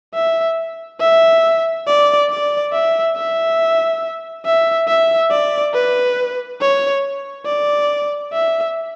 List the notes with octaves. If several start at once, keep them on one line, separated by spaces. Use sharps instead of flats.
E5
E5
D5
D5
E5
E5
E5
E5
D5
B4
C#5
D5
E5